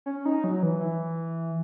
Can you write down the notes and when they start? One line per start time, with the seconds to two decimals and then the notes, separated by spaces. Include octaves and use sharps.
0.06 C#4
0.25 D#4
0.44 F#3
0.63 E3
0.81 E3